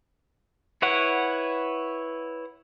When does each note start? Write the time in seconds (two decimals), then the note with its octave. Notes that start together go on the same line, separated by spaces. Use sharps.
0.82 E4 B4 C#5 F#5